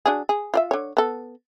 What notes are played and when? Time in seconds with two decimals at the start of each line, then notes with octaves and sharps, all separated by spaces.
0.06 F#3 D4 G#4
0.29 G#4
0.54 F4 D5 E5
0.71 D3 C#5
0.97 B3 A4